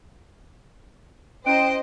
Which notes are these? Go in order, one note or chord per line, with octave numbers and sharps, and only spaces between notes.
C#4 E4 C5 D#5 G5 A#5 D7